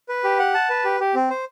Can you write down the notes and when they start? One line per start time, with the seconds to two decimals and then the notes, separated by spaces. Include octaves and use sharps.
0.09 B4
0.24 G4
0.39 F#5
0.54 A5
0.70 B4
0.84 G4
1.00 G4
1.15 C4
1.30 C5